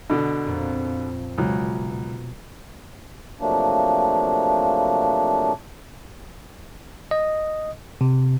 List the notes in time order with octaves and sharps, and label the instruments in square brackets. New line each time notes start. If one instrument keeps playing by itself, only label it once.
[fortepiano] B2 D3
[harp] F2 A#2
[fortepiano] C#2 F#3 [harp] B2
[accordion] C3 F3 F#3 A3 A#3 D4
[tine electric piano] D#5
C3